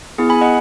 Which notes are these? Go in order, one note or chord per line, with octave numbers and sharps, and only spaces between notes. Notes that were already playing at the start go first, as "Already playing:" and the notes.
B3 E4 G#4
G#5 B5
D#5 F#5